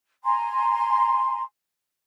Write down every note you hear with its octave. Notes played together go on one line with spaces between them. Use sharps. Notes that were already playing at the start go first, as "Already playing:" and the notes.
G#5 A#5 C6